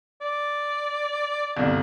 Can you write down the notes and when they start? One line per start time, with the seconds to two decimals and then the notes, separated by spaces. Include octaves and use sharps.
0.21 D5
1.57 G1 C2